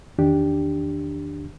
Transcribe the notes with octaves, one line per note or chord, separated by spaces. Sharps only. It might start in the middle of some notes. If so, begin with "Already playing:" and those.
E2 D#3 D4 G4